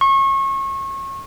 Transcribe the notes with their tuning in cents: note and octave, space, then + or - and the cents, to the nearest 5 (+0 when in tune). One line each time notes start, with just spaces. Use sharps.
C#6 -30